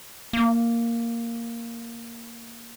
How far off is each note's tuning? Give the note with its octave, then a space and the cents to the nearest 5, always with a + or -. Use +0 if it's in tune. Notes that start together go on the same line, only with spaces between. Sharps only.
A#3 -5